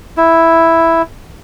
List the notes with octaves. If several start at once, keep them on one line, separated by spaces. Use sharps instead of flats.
E4